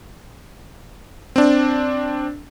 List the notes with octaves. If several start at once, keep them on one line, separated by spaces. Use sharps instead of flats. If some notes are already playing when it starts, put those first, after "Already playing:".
C4 D4